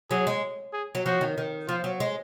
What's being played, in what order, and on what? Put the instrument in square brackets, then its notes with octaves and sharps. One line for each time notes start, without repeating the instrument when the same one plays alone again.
[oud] F#3 [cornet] G#4
[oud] G#3
[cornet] G#4
[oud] F#3
[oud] F3 [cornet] F#4
[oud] D#3
D#3
[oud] F3 [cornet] F4
[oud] F#3
G#3